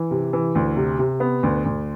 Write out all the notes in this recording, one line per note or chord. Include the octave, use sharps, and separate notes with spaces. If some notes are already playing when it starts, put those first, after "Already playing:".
Already playing: E3
C3
E3
D2
C3
C3
B3
D2
D2